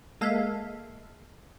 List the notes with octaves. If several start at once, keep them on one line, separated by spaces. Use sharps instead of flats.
G#3 A#3 A4 E5 F5